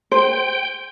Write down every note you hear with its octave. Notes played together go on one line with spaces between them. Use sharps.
C5 G5